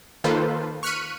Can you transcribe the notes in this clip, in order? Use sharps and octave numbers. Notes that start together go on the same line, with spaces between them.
D#3 A#3 F4 A4 B4 C5
C#6 F6 F#6 B6 C#7 D#7